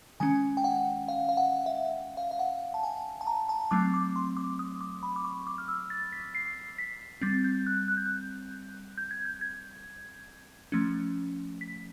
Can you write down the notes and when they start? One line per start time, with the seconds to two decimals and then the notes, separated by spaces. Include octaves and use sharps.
0.20 D#3 G#3 C#4 G#5
0.57 G5
0.64 F#5
1.08 F5
1.29 F5
1.37 F#5
1.66 E5
2.17 F5
2.31 F5
2.39 F#5
2.74 A5
2.83 G#5
3.21 A5
3.27 A#5
3.49 A5
3.71 F#3 A3 C4 D6
3.94 D6
4.16 C6
4.37 D6
4.59 D#6
4.81 D6
5.03 B5
5.16 D6
5.25 C#6
5.47 D6
5.58 F6
5.68 E6
5.90 A6
6.13 B6
6.35 C7
6.78 B6
7.21 G3 C4 A6
7.44 G6
7.66 F#6
7.88 F#6
7.97 G6
8.06 F#6
8.98 G6
9.11 G#6
9.25 G6
9.41 G#6
10.72 F3 A3 C#4
11.61 B6